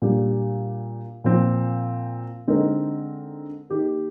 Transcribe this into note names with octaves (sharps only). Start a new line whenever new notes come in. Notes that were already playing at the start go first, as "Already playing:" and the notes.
A#2 G3 D4 G4
A#2 F3 C4
D3 G#3 C4 D#4 A#4
D#3 A#3 D#4 G4